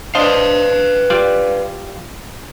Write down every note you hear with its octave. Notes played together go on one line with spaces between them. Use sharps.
D4 B4 C5 D#5 F5
G3 F4 D5